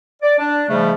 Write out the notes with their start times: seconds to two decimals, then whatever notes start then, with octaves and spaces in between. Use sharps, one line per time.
0.22 D5
0.38 D4
0.69 G#2 C#3 F3 G3 A3